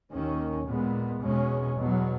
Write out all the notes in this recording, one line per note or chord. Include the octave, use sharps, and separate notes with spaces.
D#2 D#3 A#3 C#4
A#2 G#3 B3
E2 B2 G#3 C#4
E2 B2 F#3